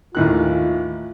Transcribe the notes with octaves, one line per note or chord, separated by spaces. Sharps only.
A1 D#2 F4 F#6